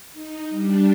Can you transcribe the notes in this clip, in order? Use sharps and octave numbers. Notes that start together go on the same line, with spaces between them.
D#4
G3 D4